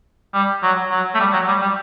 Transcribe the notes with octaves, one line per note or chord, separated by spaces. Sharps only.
G3
F#3
F#3
A3
G3
F#3
G3
G3